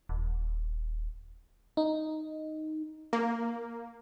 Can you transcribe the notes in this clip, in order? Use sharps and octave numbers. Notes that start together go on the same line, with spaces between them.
D#1
D#4
A#3